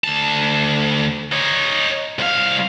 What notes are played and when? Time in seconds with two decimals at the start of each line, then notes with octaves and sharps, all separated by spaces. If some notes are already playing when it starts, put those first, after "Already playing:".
0.04 D2 A5
1.32 D#4 C#5
2.19 C2 F5